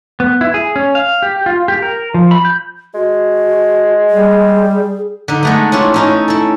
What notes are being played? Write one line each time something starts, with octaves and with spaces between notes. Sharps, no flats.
B3
E4
G#4
C#4
F5
G4
F4
G4
A#4
F3
B5
G6
G#3 F#4
G3 G#4
D3 D#4
G#3 A3 B3
C#4 D4 E4 F4
C#4 D#4 E4
E4 A4